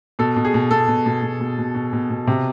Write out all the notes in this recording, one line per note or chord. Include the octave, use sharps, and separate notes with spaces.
B2 A4
B2
G#4
B2
B2 A4
B2
B2
B2
B2
B2
B2
B2
B2
C3